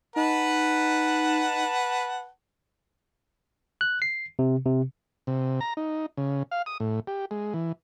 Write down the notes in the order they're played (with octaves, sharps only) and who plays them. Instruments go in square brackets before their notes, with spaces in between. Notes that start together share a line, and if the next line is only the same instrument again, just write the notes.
[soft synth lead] D#4 [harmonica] B4 F#5 A5
[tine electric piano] F#6
C7
C3
C3
[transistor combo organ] C3
A#5
D#4
C#3
F5
D#6
A2
G4
G#3
E3